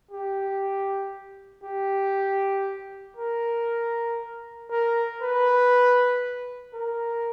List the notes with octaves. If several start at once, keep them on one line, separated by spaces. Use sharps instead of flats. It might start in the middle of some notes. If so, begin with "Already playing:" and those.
G4
G4
A#4
A#4
B4
A#4